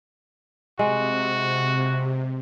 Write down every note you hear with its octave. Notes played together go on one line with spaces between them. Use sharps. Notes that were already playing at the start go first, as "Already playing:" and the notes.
C3 G#3 F#4